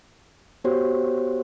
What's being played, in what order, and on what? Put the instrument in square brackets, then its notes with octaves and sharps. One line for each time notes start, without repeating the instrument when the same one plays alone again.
[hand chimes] B3 F#4 G4 C5 C#5